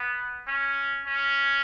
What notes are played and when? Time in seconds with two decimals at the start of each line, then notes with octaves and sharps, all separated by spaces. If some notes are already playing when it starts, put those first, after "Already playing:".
Already playing: B3
0.47 C#4
1.07 C#4